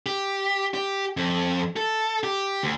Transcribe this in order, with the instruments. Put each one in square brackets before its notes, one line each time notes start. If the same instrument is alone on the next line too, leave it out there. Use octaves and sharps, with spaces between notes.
[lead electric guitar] G4
G4
F2
A4
G4
D2